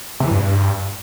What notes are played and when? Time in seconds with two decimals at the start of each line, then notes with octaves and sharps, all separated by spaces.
0.20 C3
0.26 E3
0.31 G2